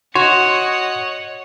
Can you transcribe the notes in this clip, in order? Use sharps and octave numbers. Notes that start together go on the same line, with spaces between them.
F#4 C#5 D#5 F#5 C6